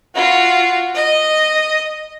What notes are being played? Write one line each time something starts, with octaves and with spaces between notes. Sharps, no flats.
F4 F#4
D#5